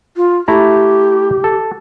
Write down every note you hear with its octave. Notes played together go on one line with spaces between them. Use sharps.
F4
A3 E4 G4 A#5
A4